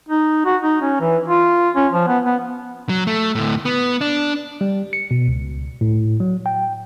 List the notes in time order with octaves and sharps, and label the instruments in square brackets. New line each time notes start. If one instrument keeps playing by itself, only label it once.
[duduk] D#4
F#4
D#4
C#4
E3
F4
C#4
F3
B3
B3
[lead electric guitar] F#3
A3
D2 A2
B3
D4
[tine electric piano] G3
C#7
B2
C#2
A2
F#3
G5